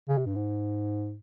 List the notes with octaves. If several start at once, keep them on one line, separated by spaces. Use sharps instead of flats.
C#3
C3
G2
G#2